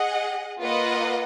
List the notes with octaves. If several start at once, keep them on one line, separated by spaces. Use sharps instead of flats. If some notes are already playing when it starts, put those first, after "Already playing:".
Already playing: G#4 D#5 F#5
A#3 F4 B4 D#5 F#5